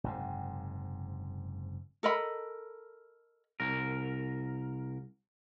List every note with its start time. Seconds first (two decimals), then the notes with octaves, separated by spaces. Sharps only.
0.04 F#1 G#2 C3
2.03 A4 A#4 D#5 B5
3.60 C2 A#4